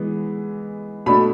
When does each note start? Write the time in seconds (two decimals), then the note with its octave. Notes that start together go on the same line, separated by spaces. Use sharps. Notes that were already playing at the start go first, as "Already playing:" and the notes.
Already playing: E3 G#3 B3
1.06 B2 A3 D4 B5